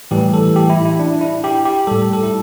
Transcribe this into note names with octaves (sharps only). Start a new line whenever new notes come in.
A2 E3 G3 G4
A4
G4
E4
E4
D4
E4
G4
G4
A2 G3 A4
A4
E4